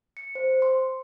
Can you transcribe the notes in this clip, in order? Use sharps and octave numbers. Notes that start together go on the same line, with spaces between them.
C#7
C5
C6